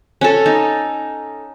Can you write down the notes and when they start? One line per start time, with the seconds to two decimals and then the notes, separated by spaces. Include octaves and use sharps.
0.21 C#4 A4
0.46 D#4